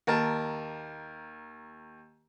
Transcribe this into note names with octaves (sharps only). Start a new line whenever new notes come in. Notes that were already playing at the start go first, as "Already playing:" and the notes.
D#2 A#4 A5